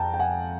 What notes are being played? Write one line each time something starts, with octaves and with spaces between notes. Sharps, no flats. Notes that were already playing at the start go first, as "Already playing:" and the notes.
Already playing: F2 F3 G5 A5 A#5
G5
F#5 G#5